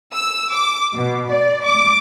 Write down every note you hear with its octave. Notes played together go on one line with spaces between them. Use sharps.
E6
D6
B2
D5
D6